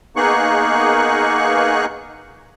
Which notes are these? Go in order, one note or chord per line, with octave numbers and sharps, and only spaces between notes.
A#3 B3 D#4 G#4 C#6 F#6